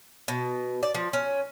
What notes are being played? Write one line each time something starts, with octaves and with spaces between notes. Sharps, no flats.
B2
D5
F3
C#4